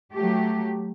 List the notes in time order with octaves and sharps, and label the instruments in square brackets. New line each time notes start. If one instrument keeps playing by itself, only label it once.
[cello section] F#3 A3 G4